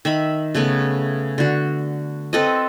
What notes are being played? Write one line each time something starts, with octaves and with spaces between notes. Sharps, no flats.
D#3 E5 B5
C#3 A3 B3
D3 F#4
C4 A4 B4 D#5